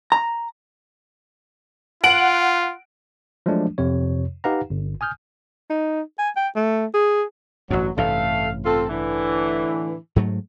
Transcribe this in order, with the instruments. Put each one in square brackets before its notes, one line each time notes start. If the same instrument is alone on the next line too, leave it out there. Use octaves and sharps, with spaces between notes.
[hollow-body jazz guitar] A#5
[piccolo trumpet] F4 [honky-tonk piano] F#5 D7 F#7
[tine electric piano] F3 F#3 G#3 A3 D4
F2 C3 C#5
D#4 G4 B4 F5 F#5 A#5
G1
G#5 D#6 F6 G6
[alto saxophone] D#4
G#5
G5
A3
G#4
[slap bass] A1 G2 [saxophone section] F#3
[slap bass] A1 G2 C3 [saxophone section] A3 F5
[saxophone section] C4 F4 A4
A2 D3 E3
[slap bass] G#2 F#3 A3